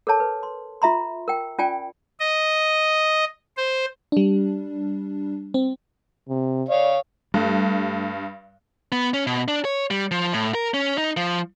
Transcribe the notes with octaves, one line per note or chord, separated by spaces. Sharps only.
A4 A#4 C#5 A5
B4
C6
F4 E5 A#5 C6
A#4 G5
C#4 F4 D5 G5 G#5
D#5
C5
G3 D4
C4
C3
C#5 D5 F5
G2 G3 A3
B3
C#4
B2
D4
C#5
G3
F3
A2
A#4
C#4
D#4
F3